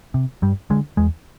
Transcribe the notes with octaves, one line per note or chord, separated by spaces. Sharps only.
C3
G2 G3
D3 G#3
E2 G#3